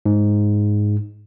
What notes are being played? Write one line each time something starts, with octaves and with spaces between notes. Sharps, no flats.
G#2